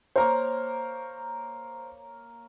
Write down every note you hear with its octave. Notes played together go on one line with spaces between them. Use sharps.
A#3 A#4 C5 C#5